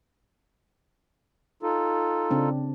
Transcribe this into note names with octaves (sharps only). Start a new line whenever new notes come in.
D#4 F4 A4
C#3 C4 D4